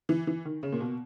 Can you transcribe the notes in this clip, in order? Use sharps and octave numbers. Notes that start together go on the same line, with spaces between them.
E3
E3
D#3
C#3
A#2
B2